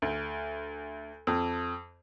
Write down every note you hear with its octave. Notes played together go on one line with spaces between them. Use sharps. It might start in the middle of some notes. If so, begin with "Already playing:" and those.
D2
F2